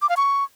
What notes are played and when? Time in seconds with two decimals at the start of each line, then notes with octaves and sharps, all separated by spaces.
0.02 D6
0.09 F5
0.17 C#6